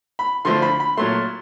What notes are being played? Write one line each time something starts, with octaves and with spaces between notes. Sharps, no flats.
B5
D3 F3 A3 C6
B5
B5
A#2 F#3 A3 C6